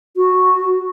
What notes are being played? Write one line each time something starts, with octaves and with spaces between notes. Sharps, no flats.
F#4